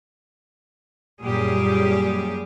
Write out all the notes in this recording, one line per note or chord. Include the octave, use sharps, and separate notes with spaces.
F#2 A#2 G3 G4 G#4